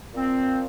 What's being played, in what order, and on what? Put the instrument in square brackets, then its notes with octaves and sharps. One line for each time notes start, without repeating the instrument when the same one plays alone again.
[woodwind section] A#2 F3 C4